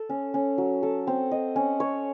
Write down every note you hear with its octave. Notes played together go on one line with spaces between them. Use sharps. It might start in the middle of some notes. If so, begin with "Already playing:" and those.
Already playing: A4
C#4
C#4
F#3
A4
C4
D#5
C#4
C#5